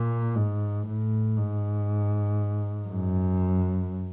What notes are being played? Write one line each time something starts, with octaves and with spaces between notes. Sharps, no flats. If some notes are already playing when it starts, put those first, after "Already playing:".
Already playing: A#2
G#2
A2
G#2
F#2